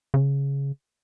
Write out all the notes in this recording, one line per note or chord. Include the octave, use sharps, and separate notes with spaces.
C#3